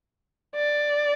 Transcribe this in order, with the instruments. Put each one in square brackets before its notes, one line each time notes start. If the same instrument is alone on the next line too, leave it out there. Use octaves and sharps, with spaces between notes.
[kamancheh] D5